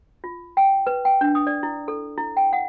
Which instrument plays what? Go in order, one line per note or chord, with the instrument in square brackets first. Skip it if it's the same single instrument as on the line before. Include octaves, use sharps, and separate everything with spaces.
[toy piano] F4
G5
B4
G5
D4
D#6
D5
E4
A4
E4
G5
F#5